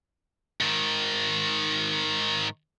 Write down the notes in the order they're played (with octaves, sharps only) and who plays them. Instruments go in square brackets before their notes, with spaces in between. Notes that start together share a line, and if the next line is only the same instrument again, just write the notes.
[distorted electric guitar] G#2 D#3